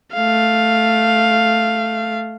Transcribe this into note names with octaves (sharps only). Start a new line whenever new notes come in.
A3 F5